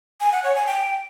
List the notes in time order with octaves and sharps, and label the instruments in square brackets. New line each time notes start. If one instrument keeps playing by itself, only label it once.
[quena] G#5
F#5
C#5
G#5
G5